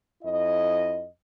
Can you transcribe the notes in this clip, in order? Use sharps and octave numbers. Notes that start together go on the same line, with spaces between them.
F2 E4 D#5